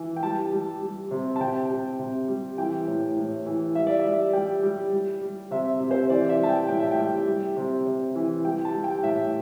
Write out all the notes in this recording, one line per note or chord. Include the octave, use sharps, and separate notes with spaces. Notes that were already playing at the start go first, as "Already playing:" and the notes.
Already playing: E3
G5
G3 A5
G3
G3
C3
A5
C3 G5
C3
C3
G3
E3 G5
A2
A2
E3
G3 E5
D5
G3 E5
G3 G5
G3
G3
G3
C3 E5
C3
C5
E3 D5
E5
G3 A5
G5
A2 G5
E5
G5
G3
G3
C3
C3
E3
G3 G5
A5
G3
G5
A2 E5